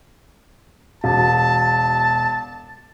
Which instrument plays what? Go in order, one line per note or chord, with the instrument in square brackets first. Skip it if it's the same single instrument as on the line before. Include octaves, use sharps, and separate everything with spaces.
[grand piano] E1 [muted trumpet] A5